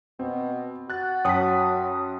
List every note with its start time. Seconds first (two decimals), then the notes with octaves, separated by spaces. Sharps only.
0.19 B2 C4
0.90 F#4 F#6 A6
1.25 F#2 C#5 G5 A5 D#6 B6